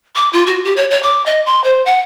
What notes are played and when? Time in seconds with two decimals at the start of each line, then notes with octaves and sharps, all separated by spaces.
0.16 D6
0.33 F4
0.47 F#4
0.65 G4
0.76 C#5
0.91 C#5
1.03 D6
1.26 D#5
1.46 C6
1.64 C5
1.85 F#5